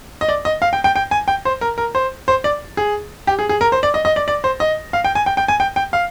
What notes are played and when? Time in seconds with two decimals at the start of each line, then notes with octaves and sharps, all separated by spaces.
0.21 D#5
0.29 D5
0.45 D#5
0.62 F5
0.73 G5
0.84 G5
0.96 G5
1.11 G#5
1.28 G5
1.45 C5
1.61 A#4
1.78 A#4
1.95 C5
2.28 C5
2.44 D5
2.77 G#4
3.27 G4
3.39 G#4
3.49 G#4
3.61 A#4
3.72 C5
3.83 D5
3.94 D#5
4.05 D#5
4.16 D5
4.28 D5
4.44 C5
4.60 D#5
4.93 F5
5.05 G5
5.15 G#5
5.26 G5
5.37 G5
5.48 G#5
5.60 G5
5.76 G5
5.93 F5